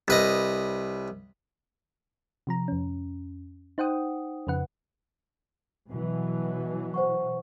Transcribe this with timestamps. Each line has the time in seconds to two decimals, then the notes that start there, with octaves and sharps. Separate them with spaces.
0.08 C2 B4 D#5
2.47 C3 F3 A#5
2.68 F2 C#4
3.78 D#4 C5 F#5 G5 D#6
4.47 F2 C#3 B4 F#5
5.89 B2 E3 F#3
6.94 C5 F#5 C#6